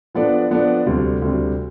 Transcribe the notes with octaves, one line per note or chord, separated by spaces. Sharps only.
F3 B3 D4 A4 D5
F3 B3 D4 A4 D5
D2 C3 G3
D2 C3 G3